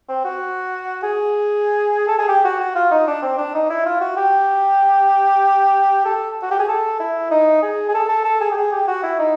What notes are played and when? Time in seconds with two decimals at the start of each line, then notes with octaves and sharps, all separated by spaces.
0.09 C4
0.25 F#4
1.03 G#4
2.08 A4
2.19 G#4
2.28 G4
2.45 F#4
2.60 F#4
2.75 F4
2.91 D#4
3.07 D4
3.22 C4
3.38 D4
3.54 D#4
3.70 E4
3.86 F4
4.01 F#4
4.17 G4
6.05 A4
6.42 F#4
6.51 G4
6.60 G#4
6.69 A4
7.00 E4
7.31 D#4
7.63 G#4
7.89 G#4
7.94 A4
8.09 A4
8.25 A4
8.41 G#4
8.52 G4
8.57 G#4
8.72 G4
8.88 F#4
9.03 E4
9.19 D#4